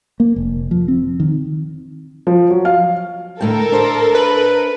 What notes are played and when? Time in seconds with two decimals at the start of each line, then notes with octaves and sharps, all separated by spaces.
0.20 A#3
0.36 F1
0.71 F3
0.88 C4
1.20 D#3
2.27 F3
2.50 F#3
2.65 F5
3.41 D2 A2 A4 A#4 G5
3.72 D4 C5 E5
4.15 B4